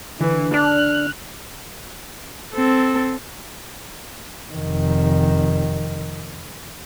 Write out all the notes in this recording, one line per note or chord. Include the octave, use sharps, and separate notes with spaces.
D3 E3
D4 F6 F#6
C4 A4
F1 D#3